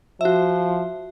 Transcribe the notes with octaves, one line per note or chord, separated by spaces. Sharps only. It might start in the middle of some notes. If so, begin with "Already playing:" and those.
F3 F#4 E5